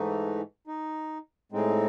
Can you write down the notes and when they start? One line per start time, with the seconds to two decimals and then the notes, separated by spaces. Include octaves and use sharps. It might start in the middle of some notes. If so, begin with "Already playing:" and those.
Already playing: G#2 E3 A3 D#4
0.67 D#4
1.52 A2 G#3 C4 D#4